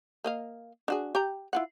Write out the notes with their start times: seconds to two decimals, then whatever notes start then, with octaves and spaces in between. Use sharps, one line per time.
0.24 A#3 D#5 F5
0.88 D4 F#4 G#4
1.15 G4 G5 A#5
1.53 E4 F4 F#5